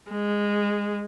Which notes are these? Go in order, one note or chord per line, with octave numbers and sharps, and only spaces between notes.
G#3